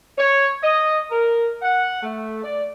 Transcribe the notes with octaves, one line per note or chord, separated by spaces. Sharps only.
C#5
D#5
A#4
F#5
A3
D5